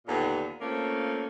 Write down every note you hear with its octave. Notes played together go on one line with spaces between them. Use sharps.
D#2 A#2 D3 B3
A3 A#3 C4 C#4 F4